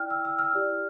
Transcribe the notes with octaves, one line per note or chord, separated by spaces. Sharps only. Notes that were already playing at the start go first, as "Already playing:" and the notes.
Already playing: E4 D5 G5 F6
E6
E6
F6
E4 G4 D5